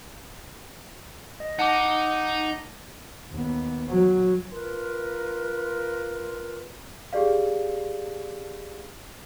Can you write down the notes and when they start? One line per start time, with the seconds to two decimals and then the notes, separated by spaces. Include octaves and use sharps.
1.40 D#5
1.59 D#4 F#5 A5 D6
3.31 D#2 B3
3.88 F#3
4.51 F4 A#4 B4 C6
7.13 G4 G#4 D5 F5